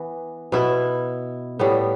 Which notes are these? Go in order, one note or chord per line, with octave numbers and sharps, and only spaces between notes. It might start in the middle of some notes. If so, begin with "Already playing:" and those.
Already playing: E3 B3
B2 B3 E4
A2 G3 B3